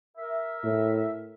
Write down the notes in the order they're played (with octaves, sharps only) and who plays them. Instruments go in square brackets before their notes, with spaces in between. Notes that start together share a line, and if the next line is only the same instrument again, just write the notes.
[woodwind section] A#4 E5
[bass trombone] A2